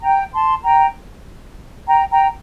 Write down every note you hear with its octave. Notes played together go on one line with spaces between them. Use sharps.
G5 A#5
A5 C6
G5 A#5
G5 A#5
G5 A#5